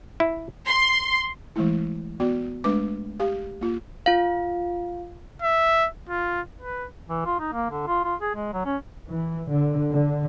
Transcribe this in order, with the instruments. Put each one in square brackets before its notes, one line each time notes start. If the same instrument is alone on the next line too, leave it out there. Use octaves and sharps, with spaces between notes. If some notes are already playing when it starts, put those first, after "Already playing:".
[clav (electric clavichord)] E4
[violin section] C6
[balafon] E3 G#3 A3 E4
B3 F#4 D5
G#3 A3 D4 B4 D6
G4 F5
A#3 F4
[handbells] F4 F5
[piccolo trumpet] E5
F4
B4
[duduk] E3
F4
D#4
A#3
D3
F4
F4
G#4
G#3
F#3
C#4
[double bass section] E3
D3
D3